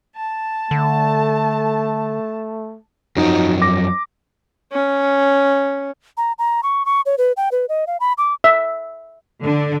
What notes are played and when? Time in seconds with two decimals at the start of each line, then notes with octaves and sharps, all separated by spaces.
0.15 A5
0.71 D3 A3
3.16 F#2 F3 F#3 D#4
3.62 D6 A#6
4.72 C#4
6.17 A#5
6.39 A#5
6.63 C#6
6.86 C#6
7.06 C#5
7.18 B4
7.37 G5
7.52 B4
7.69 D#5
7.87 F5
8.00 B5
8.18 D6
8.44 E5
9.44 D3